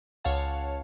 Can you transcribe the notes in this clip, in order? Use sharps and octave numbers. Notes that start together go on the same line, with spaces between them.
C#2 C#5 F5 F#5 A5